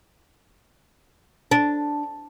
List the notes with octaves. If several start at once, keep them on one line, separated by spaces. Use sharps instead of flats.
D4